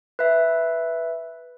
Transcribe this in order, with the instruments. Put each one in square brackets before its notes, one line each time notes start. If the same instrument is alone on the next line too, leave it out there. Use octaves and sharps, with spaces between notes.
[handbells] B4 E5